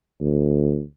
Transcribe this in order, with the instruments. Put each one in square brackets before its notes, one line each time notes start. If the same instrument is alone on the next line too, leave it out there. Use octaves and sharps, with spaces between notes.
[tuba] D2